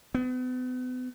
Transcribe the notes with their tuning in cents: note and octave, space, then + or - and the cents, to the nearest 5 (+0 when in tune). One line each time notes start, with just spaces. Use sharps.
B3 +40